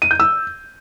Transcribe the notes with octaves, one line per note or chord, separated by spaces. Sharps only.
D#7
G6
E6